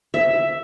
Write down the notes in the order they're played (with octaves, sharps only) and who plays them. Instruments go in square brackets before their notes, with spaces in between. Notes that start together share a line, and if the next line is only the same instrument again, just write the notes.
[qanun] E5